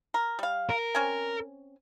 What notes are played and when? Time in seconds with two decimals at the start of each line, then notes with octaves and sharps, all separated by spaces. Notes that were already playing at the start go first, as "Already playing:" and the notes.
0.14 A#4
0.39 G3 F5
0.69 A#4
0.95 C4 C#4 G#5